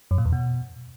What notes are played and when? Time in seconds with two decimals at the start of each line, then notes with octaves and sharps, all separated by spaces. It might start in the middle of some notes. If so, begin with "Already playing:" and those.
0.11 F#2
0.18 A#2
0.25 E2
0.32 B2